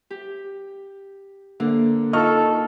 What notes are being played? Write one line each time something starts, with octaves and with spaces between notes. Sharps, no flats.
G4
D3 A#3
D#4 F4 A4 D#5 C#6 F6